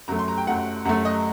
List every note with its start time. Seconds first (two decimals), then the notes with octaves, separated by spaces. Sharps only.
0.08 F#2 F#3 A3 A#5
0.19 C6
0.28 A#5
0.38 G5
0.47 F#2 F#3 A3 F#5
0.85 F#2 F#3 A3 F#5
1.05 D#5